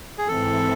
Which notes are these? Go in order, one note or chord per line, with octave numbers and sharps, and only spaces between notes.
G#4
G#2 E3 C4 E4 A4